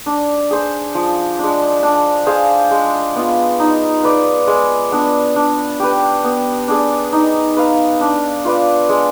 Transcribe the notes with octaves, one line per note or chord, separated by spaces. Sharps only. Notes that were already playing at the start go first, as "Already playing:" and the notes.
D4
G#4 C5
F3
G#3 D4
D4
G#4 C5 F5
G#3
B3 F4
D#4
B4 D5
G#3
B3 D4
D4
G4 B4
B3
D4 G#4 D5
D#4
B4 F5
D4
F4 B4 D5
G#3